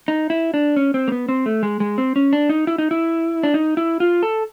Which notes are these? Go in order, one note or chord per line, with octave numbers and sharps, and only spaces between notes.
D#4
E4
D4
C#4
C4
A#3
B3
C4
A3
G#3
G#3
C4
C#4
D4
D#4
E4
D#4
E4
D4
D#4
E4
F4
A4